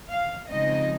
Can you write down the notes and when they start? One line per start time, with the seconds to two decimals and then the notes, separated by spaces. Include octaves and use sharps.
0.10 F5
0.49 C#3 F3 G#3 C4 D#4 D#5